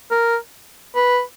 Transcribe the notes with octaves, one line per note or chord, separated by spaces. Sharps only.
A#4
B4